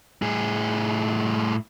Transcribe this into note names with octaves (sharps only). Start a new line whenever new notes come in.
A2 G#4